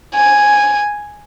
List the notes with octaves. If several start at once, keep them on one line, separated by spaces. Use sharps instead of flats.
G#5